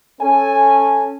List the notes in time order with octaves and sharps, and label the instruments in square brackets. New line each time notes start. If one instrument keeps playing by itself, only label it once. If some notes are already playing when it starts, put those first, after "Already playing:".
[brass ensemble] C#4 A4 G#5